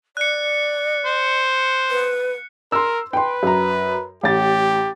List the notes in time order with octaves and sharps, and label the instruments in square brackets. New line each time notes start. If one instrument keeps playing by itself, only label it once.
[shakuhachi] D5 [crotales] F#6 C#7
[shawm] C5
[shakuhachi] B4
[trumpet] A#4 [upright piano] C6 E6
[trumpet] B4 [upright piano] G5 C6
[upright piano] F#2 A#5
[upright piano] A1 A6 [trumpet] G4